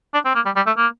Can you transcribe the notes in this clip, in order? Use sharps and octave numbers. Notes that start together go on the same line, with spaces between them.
D4
C4
A#3
G3
G3
A3
A#3